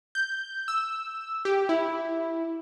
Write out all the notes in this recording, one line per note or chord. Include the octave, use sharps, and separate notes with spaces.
G6
E6
G4
E4